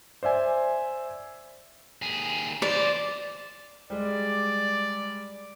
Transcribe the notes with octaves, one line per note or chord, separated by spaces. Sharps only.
C5 D5 E5 G#5
D#2 G#4
E3 C5 D5
G3 G#3 D5